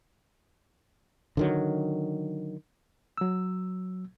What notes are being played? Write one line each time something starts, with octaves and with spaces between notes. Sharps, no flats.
D3 D#3 F#3
F#3 E6